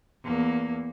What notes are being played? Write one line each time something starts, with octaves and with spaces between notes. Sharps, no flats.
E2 A#3